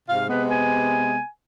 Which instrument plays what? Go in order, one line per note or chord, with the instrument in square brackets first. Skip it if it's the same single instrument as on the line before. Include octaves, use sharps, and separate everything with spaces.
[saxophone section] G#2 C3 F5
[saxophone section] C3 G#3 B3 [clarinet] B4
[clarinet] G#5